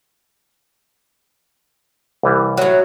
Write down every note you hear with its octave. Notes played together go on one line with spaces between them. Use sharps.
C2 E3 G3
A2 F#3